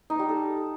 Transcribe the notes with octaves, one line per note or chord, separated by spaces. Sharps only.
D#4
G3
A4